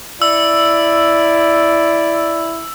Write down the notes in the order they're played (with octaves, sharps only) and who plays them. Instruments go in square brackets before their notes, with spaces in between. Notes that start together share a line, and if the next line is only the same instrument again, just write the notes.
[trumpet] E4 [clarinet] D5 [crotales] E6